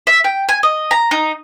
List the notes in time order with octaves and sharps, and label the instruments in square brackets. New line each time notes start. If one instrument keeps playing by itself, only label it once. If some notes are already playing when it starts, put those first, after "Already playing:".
[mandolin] E5
G5
G#5
D#5
A#5
D#4